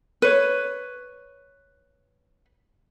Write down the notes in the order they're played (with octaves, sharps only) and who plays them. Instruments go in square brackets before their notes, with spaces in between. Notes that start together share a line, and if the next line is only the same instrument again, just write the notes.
[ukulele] B4 C#5